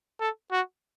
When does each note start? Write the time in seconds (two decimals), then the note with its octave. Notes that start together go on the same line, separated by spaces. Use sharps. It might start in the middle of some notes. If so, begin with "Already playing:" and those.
0.20 A4
0.52 F#4